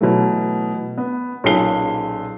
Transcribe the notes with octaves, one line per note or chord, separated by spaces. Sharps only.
B2 E3 F#3 A3
B3
B1 A#2 C#4 G#4 C7 G7